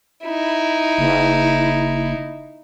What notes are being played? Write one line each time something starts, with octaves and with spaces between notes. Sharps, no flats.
D#4 E4
F#1